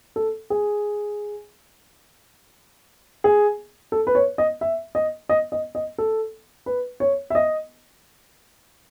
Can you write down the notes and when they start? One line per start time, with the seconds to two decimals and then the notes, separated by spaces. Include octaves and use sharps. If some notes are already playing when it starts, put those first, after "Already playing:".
0.16 A4
0.50 G#4
3.24 G#4
3.92 A4
4.07 B4
4.15 C#5
4.38 D#5
4.61 E5
4.95 D#5
5.29 D#5
5.52 D#5
5.75 D#5
5.98 A4
6.66 B4
7.00 C#5
7.30 E5
7.35 D#5